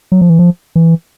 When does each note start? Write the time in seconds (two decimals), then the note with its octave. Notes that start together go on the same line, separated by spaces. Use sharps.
0.12 F#3
0.21 F3
0.30 E3
0.39 F3
0.76 E3